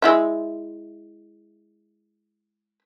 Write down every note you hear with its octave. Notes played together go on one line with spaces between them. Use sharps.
G#3 E4 E5